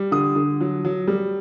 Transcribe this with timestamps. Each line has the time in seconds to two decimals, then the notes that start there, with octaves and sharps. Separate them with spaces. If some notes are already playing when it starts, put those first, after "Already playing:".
Already playing: G3
0.11 D3 D#6
0.35 D3
0.61 F#3
0.85 F#3
1.08 G3